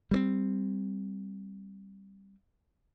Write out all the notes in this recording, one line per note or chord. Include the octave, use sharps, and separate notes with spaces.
G3 A3 C4